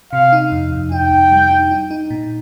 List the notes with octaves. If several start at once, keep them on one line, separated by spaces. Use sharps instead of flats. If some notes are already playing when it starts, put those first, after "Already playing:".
C3 F5
D#4
F2
F2
D#4 G5
F2
G3
D#4
D#4
D#4
A#2